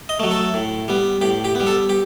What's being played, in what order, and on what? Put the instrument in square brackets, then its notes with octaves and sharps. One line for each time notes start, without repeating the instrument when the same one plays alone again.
[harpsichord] D#5
F#3 A3
A4
A2
G3 B3
A2 G4
G4
G3 B3
A4
G4